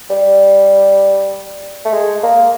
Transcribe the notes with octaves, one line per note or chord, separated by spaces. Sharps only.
G3
A3
G#3
A#3